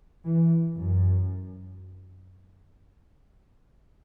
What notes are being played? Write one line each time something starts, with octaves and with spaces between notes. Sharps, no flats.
E3
F#2